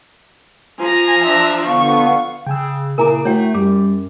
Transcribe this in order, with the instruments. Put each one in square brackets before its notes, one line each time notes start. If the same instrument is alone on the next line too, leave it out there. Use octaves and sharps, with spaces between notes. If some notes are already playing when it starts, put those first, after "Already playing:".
[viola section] F3 [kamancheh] G#5 [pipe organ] A#5
[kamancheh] D4 E5
[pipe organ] D3 B3 [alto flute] F5 [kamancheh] C#6
[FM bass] C#3 [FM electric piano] G5 G#5 E6
[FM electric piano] A#2 E4 D6 [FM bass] C#3 [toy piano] A#4 G#5 A#5
[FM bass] A3 [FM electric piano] E4 F#4 [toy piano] C#5 G5
[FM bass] F#2 [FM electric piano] G3 [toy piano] D6